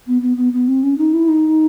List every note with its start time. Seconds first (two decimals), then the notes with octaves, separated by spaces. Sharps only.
0.07 B3
0.22 B3
0.37 B3
0.53 B3
0.68 C4
0.83 C#4
0.98 D#4
1.13 E4
1.28 D#4